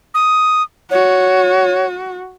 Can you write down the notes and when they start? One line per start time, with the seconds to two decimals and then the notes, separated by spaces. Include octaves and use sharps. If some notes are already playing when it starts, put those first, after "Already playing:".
0.14 D#6
0.91 F#4 C#5